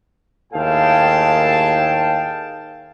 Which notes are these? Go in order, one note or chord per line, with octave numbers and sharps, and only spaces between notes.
D#2 A2 G#4 F5 G5 A5